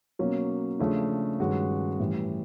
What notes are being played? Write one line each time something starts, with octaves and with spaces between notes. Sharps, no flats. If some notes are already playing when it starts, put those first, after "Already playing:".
B2 F#3 A#3 C#4
C#3 F3 A3 D4
G2 D#3 G#3 C#4 F#4
A2 E3 G3